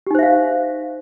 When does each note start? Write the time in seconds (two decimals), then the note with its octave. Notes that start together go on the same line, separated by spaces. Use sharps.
0.07 G4
0.11 D#4
0.15 C5
0.19 E5
0.23 F5